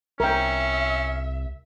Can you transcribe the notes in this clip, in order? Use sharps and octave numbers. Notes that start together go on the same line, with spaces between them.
C2 C#4 A#4 E5 G5